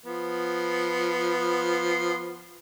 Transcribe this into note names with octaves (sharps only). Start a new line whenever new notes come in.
F3 B3